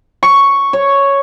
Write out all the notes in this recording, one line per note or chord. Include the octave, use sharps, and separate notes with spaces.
C#6
C#5